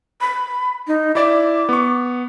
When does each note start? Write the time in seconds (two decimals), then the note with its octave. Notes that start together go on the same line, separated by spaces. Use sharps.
0.21 B5
0.87 D#4
1.15 E4 D5 E5 D6
1.69 B3 C#6